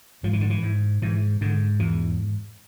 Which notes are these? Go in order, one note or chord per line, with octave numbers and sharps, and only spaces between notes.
G#2 F3
E3
D3
E3
G#2
G#2 E3
G#2 D3
E2 E3